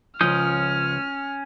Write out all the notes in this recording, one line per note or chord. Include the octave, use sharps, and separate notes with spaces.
C#2 F3 C#4 D#6 F6 G6